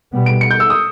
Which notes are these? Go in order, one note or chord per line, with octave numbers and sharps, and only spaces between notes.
B2 G3 B3
D7
C#7
G6
E6
D#6